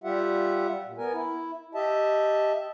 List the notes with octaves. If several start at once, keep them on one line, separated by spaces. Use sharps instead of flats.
G3 F4 G4 E5 F#5
A#2
B3 A#4 G#5
E4
G4 D#5 E5 A5